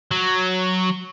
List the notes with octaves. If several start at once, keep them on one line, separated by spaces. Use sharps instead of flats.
F#3